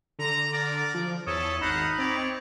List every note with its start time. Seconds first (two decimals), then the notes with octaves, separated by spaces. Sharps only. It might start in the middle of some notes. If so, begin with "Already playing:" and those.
0.19 D3 A#5
0.53 A#4 D5
0.94 F3
1.27 E2 B3 A4 C#5 D#6
1.61 G#1 D#4 D#5 F5 F#5 B5
1.98 C4 E4 C#5 D5